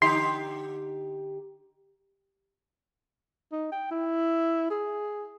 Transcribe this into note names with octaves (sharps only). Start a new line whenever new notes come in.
D3 D#4 G4 C6
D#4
G5
E4
G#4